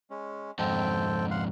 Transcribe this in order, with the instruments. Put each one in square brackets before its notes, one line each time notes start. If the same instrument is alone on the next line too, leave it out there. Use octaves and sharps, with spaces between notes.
[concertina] G#3 C#4
[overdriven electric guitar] F2 G#2 [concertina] C4 A4 G5
[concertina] F5 F#5 C6